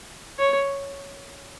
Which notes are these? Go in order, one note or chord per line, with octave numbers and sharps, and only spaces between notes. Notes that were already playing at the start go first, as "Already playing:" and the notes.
C#5